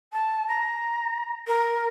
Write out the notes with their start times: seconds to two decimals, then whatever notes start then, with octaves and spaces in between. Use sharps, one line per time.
0.13 A5
0.48 A#5
1.47 A#4